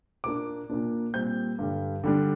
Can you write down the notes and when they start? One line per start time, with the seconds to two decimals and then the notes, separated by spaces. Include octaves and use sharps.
0.24 A#2 A#3 D4 D6
0.70 A#2 A#3 D4
1.14 A#2 G3 C4 G6
1.59 G2 D3 G3
2.04 D3 G3 D4